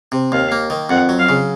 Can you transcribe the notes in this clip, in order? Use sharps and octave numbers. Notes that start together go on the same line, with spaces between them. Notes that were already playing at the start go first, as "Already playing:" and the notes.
C3
D#2 F5
A#3
D#3
F2 F#5
F#3
F5
C#3